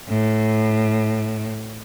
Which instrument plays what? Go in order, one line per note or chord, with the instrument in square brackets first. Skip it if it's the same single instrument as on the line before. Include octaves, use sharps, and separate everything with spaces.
[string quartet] A2